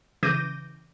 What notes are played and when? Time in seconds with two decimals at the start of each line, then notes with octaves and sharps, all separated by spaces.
0.23 C#3 E3 D6 G6 A#6 D#7